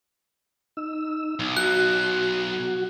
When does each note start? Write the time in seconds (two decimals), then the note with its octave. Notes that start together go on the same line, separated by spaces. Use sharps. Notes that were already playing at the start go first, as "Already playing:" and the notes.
0.77 D#4 E6
1.40 B1
1.57 F#4 F#6